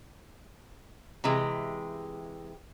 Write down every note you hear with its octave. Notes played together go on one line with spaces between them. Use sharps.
C3 E3 G#3 G4